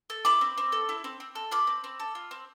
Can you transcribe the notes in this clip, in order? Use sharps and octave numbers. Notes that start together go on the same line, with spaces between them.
A4
E4 B5 D6
C4
C4
A4
E4
C4
C4
A4
F4 B5 D6
C4
C4
A4
F4
C4